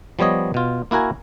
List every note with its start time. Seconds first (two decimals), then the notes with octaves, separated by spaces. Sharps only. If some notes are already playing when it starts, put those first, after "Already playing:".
0.19 F3 G3 B3 C#5 D#5
0.54 B2 F4
0.91 A#3 E4 F#4 A#4 G#5